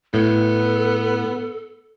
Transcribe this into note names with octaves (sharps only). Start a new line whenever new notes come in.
A2 B3 A4